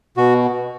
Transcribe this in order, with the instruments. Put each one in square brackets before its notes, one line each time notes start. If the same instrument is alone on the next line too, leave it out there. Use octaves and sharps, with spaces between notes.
[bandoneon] B2 F#4